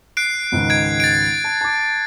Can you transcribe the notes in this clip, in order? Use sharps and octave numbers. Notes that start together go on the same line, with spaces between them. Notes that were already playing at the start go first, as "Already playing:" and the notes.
F#6 C7 D7
C#2 G#2 D#3
G#6 D7
A6 C7 D7
A5
A5 D6